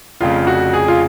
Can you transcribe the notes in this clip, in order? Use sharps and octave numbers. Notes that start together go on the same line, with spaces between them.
F1 F2 C#3 F4
F#4
G#4
F4